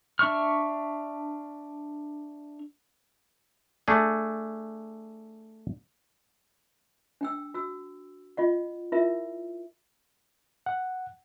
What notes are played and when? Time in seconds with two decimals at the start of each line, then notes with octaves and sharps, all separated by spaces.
0.19 D4 E5 C#6 F6
3.88 A3 D4 G#4
7.21 D4 G5 E6
7.54 F#4 E6
8.37 F4 D#5 F#5
8.92 E4 F4 A#4 E5
10.66 F#5